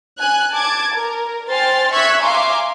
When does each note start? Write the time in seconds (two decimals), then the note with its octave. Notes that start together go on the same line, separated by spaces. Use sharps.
0.19 G#5 F#6
0.53 A5 D6 G#6
0.94 A#4
1.49 C5 G5 G#5 C6 F6 A6
1.91 E5 C#6 E6 F#6 G#6 B6
2.22 E5 F5 G#5 A#5 C6 D6